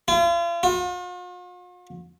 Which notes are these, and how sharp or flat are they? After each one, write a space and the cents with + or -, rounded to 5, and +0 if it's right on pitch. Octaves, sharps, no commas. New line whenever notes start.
F4 -40
F4 +45